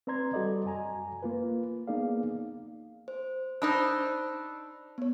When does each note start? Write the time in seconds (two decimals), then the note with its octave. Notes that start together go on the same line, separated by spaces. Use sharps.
0.07 C4 B4 D5 A#5 C6 G#6
0.33 G3 F#4 A4 D5 D#5
0.65 F#2 G#5 A#5
1.23 A#3 F4 B4
1.87 A#3 B3 D#4 G#4 D5 F5
3.08 C5
3.62 D4 D#4 C5 B5 E6 F#6
4.98 B3 C#5